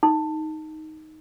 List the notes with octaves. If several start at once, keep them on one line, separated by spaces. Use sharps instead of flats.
D#4